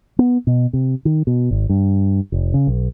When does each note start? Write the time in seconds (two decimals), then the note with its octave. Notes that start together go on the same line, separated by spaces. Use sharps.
0.19 B3
0.47 B2
0.73 C3
1.05 D#3
1.27 B2
1.51 G#1
1.69 G2
2.32 F1
2.54 C#3
2.67 B1